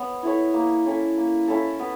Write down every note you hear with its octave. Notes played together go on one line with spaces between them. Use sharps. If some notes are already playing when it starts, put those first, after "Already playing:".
Already playing: B3 C#5
E4 A4 C#5
A#3
C#4 E4 A4
A#3
C#4 E4 A4
B3